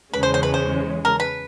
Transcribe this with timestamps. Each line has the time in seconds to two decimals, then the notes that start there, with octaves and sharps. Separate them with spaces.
0.13 E2 C#3 E3 G#3 C#4 B4
0.23 C5
0.34 C5
0.43 B4
0.54 C5
1.05 A#4
1.20 B4